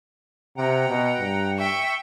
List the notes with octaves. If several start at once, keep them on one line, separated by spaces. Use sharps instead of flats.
C3 F#5 G5 A#5
B2
G2
E5 G5 C#6